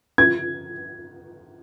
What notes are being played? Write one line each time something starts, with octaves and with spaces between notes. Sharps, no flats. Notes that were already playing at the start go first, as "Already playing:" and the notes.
G#6